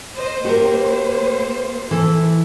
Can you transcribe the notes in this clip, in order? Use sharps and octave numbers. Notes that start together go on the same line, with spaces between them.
C5 D#5
A#3 F#4 G4 A#4 C5
E3 A4